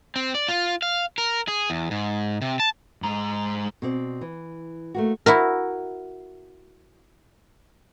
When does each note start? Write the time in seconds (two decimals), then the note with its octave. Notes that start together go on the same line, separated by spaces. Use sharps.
0.16 C4
0.34 D5
0.48 F4
0.82 F5
1.18 A#4
1.48 G#4
1.70 E2
1.91 G#2
2.42 C3
2.60 A5
3.02 G#2 A#5
3.82 B2 C4 D5
4.21 E3
4.95 A3 A#3 F#4
5.26 E4 F#4 A#4